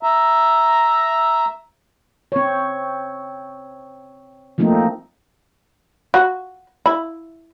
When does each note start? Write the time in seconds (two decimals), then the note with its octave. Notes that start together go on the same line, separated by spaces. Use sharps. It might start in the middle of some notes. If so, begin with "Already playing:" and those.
0.03 E5 A#5
2.32 C4 C#5
4.58 F3 A3 A#3 C4 D#4
6.14 F#4
6.86 E4